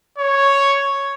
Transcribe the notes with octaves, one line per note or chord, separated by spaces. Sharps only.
C#5